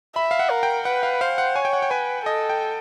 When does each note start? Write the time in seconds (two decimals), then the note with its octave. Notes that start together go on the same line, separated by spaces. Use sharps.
0.16 E5 B5
0.31 F5
0.39 F#5
0.50 A#4
0.63 G5
0.85 B4 F#5
1.03 F5
1.21 C5 F5
1.38 F#5
1.56 C#5 G#5
1.65 G5
1.73 F#5
1.82 G5
1.90 B4 G#5
2.26 A4 D#5
2.49 G5